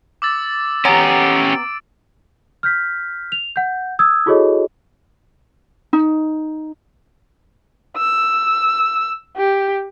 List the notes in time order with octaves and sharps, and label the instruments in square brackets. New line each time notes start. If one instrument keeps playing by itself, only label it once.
[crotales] D6 E6 A6
[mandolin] B3 A#5 [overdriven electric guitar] C#4 G4 [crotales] D7
[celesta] F6 G6 B6
F7
F#5 G6
D#6 E6 G#6
E4 F#4 G#4 A4 C#5 D#5
[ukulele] D#4
[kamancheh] E6
G4